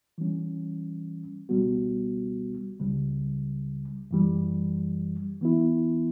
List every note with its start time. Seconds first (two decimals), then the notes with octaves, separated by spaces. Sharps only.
0.18 E3 G3 C#4
1.49 C#2 B2 G3 B3 F#4
2.80 C#2 C#3 G3
4.11 F#2 E3 G3
5.41 E3 B3 E4